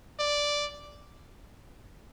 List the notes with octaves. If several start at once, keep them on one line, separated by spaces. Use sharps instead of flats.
D5